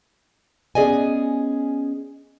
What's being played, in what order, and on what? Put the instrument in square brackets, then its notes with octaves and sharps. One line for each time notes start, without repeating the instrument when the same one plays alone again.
[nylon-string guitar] B3 C#4 G#4 D5 D#5 G#5